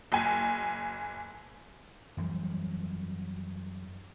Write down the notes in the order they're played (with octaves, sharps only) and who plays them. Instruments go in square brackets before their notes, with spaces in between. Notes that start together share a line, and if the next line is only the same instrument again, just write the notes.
[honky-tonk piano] F#1 G#5
[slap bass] F#2 E3 F3 G3